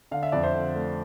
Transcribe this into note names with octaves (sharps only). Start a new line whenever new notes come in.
D3 F5
E5
F2 D5
C5 E5
D3
A3